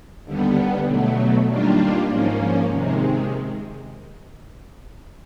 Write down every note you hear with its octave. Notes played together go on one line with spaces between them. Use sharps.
D#2 D3 G3 B3
B2 F#3 A3
D#3 G3 A#3 D4 F4
G#2 F3 A#3 C#4
C3 D#3 G#3